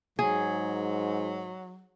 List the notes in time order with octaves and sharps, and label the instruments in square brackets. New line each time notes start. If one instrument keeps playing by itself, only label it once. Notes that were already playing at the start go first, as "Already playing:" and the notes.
[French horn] G#2 [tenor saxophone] F#3 [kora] G#4